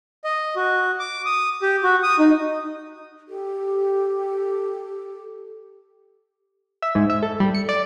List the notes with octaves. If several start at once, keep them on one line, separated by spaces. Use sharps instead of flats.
D#5
F#4
D6
D#6
G4
F#4
D#6
D#4
G4 A4
E5
G#2
E5
A4
G3
C#7
D5